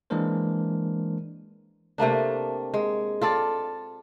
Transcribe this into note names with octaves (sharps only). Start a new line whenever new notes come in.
E3 G#3 A#3 D4 A#4 C5
C3 A3 A#3 D4
G#3
F4 A4 D5